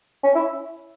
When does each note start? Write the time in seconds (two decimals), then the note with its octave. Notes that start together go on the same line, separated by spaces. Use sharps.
0.23 C#4
0.35 E4